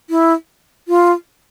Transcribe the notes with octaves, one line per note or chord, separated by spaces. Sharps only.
E4
F4